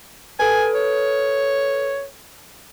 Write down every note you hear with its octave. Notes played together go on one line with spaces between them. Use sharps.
A4 B4 G#5
C#5